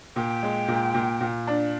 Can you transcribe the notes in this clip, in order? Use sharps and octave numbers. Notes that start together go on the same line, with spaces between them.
A#2 G5
G#3
A#2
A#2
A#2
D4